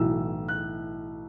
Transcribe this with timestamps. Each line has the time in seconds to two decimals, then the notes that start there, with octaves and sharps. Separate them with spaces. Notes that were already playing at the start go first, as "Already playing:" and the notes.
Already playing: B1 A2 E3 E6
0.48 F#6